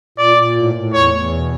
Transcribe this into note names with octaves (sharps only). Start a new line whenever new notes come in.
A#2 D5
A#2
A2
A2
E2 C#5
E2
B2